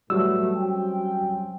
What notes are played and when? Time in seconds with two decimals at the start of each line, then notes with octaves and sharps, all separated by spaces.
0.10 A2 E3 F#3 G3 A3 F#4 E6
0.56 C4 C#4 G5